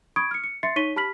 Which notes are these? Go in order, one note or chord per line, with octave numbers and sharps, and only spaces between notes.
B5 C#6 D#6 G#6 D7
F6 C#7
C#7
E5 C6 A6 C7 C#7
D#4 C#5 C#6 B6 D#7 G7
G4 A5 B5 F6 B6 F#7